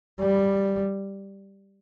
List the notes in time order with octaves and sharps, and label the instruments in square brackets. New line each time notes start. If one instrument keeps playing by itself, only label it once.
[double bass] G3